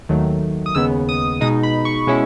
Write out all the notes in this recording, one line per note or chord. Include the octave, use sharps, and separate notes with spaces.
D#2 D#3 F#3 A3
D#6
D#2 C#3 G#3 B3 E6
D#6
B2 G#3 D#4 D#6
B5
C#6
B2 G#3 C#4 E4